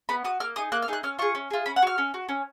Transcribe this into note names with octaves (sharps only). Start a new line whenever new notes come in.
B3 B5
F#4 D#6
A#3 F6
D#4 G#4 D#6
A#3 F#6
F6
D#4 G#4 F#6
C#4 F6
F4 G#4 C#6
C#4
F4 G#4
C#4 B5
F#5
F#4 F6
C#4
F#4
C#4